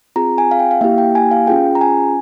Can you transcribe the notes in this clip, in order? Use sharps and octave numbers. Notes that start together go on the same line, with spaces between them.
C4 F4 G#4 A#5
G#5
F5
G5
F5
A#3 E4 G4 E5
G5
G#5
F5
C#4 F4 G#4 G5
A#5
G#5